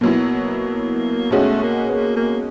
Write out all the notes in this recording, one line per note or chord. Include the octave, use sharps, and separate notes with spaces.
B2 F#3 A#3 B3 E4
B2 G#3 A3 C#4 F#4
A#3
B3
A#3
A#3